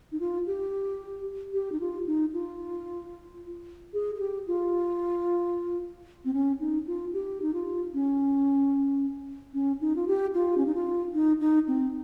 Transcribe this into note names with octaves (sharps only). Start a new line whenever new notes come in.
D#4
F4
G4
G4
D#4
F4
D#4
F4
G#4
G#4
G4
F4
C4
C#4
D#4
F4
G4
D#4
F4
C#4
C#4
D#4
F4
G4
F4
C#4
D#4
F4
D#4
D#4
C4